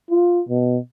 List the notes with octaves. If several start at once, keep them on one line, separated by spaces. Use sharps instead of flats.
F4
B2